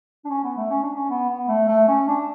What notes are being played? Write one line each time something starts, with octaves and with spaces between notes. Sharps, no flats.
D4
C#4
B3
A3
C#4
D4
C#4
B3
B3
A3
A3
C#4
D4